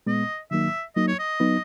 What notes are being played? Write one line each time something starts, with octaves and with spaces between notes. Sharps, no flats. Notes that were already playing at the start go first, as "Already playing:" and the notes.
A#2 G#3 B3 D#5
D#3 F#3 A#3 D#4 E5
F#3 A#3 D#4 D#5
C#5
D#5
F#3 B3 D#4